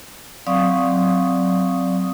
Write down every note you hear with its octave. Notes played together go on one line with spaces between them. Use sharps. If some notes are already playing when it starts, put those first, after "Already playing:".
F#3 C4 D5 F5 C#6 D#6